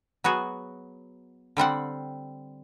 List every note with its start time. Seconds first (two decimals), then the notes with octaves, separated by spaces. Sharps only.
0.24 F#3 B3 F#4 G#4
1.57 D3 G3 C4 F#5